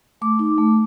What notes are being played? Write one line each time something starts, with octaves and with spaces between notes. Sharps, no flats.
A3 D6
D#4
A3